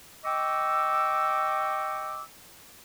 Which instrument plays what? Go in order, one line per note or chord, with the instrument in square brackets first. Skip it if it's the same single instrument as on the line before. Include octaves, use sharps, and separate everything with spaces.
[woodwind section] D#5 G5 C#6 D6 E6